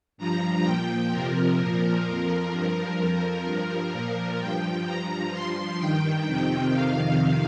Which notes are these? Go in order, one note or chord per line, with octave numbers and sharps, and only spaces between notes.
G2 F3 A#5
A#2 F3 G5
F2 C3 F3 A#4
A#2 F3
F2 F3
G2 F3 A#4
F2 F3
G2 F3
A#2 F3
G2 F3 G5
G2 F3 A#5
G2 F3 C6
G2 D#3 G5
F2 C3 D#3 G5
F2 C3 D#3 F5